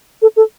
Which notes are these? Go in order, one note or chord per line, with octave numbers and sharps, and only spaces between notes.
A4
A4